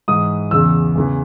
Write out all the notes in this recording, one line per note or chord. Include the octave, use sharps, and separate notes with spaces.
G#2 E3 D#6
E2 C#3 E3 E6
E2 C#3 E3